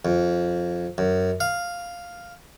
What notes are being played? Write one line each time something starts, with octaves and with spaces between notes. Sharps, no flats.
F2
F#2
F5